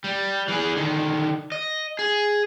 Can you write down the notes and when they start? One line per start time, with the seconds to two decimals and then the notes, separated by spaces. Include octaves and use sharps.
0.04 G3
0.48 E3 G#4
0.76 D3 D#3
1.52 D#5
1.99 G#4